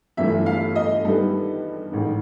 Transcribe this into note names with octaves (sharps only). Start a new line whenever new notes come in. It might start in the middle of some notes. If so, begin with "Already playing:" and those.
G1 G2 E3 A3 E5
F5
D#5
G2 D#3 G3 B3 A4
A1 G#2 D#3